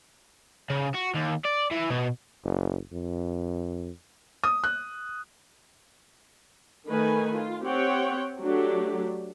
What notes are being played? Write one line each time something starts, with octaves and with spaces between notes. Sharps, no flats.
C#3
F#4
D#2
D5
E3
B2
F#1
F2
D#6
F#6
D#3 A3 D#4 B4 G#5
F4
C4 G4 C#5 F#5 G5
F#3 A3 D4 G4